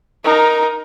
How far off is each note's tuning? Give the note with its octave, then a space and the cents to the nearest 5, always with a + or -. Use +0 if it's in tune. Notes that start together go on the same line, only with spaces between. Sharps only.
D#4 +0 A#4 +10